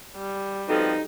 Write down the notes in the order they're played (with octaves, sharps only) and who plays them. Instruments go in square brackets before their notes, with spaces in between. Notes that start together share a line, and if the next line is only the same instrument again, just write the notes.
[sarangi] G3
[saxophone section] F3 B3 C4 [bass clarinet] D#4 [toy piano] F#4 A4 E6